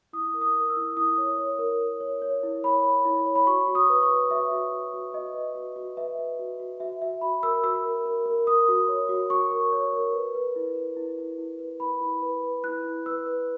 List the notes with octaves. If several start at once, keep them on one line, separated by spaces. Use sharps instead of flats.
E4 D#6
A#4
D#6
A#4
E6
E4
E4 D#6
C#5
C#5
A#4
A#4
C#5
C#5
E4
C#5 B5
C#5
E4
C#5
B5
F#4 C#6
F#4
D#6
B4
C#6
B4
F#4 E5
F#4
F#4
F#4
F#4 D#5
B4
F#4
F#4
B4 E5
B4
F#4
F#4
F#4 E5
F#4 E5
F#4 B5
A#4 E6
F#4 E6
A#4
A#4
A#4
A#4 D#6
F#4
C#5
F#4
F#4 C#6
A#4
C#5
A#4
B4
B4
E4
B4
E4
E4
E4
B4
E4 B5
E4
B4
B4
E4 F#6
E4
B4 E6
B4